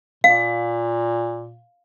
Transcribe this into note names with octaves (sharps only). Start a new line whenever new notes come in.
A#2 F5